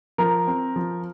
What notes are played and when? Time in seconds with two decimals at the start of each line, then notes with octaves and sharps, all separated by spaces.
0.18 F3 A#4
0.47 C4
0.76 F3